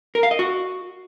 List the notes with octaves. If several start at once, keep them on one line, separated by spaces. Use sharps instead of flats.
A#4
F5
D#5
F#4